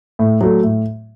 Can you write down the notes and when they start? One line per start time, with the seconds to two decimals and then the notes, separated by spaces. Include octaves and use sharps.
0.19 A2
0.41 F#3 A3
0.63 A2